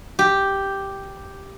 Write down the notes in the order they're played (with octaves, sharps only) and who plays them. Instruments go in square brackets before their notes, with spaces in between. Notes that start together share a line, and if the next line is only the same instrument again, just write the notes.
[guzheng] G4